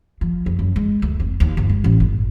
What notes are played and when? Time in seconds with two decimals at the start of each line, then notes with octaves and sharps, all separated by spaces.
0.21 F3
0.46 F2
0.59 F#2
0.76 G#3
1.02 D2
1.20 F1
1.40 D#2
1.57 G1
1.69 G#3
1.84 A1
2.00 G1